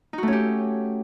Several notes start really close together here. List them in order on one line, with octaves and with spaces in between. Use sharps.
D#4 F#4 A3 C#4 G4